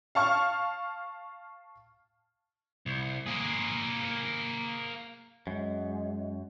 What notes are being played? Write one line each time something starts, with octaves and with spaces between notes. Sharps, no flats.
F5 A5 C#6 F6
C2
A#3 G#4
F#2 G#3